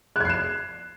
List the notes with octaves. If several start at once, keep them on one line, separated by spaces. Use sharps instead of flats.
F#6 G#6 C7 E7